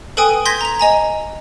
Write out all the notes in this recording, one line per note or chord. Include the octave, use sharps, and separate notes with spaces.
A4 B4 G5 G#5 D#6
C6 G6 G#6 A#6 B6
A#5 F7
D#5 G#5 A#5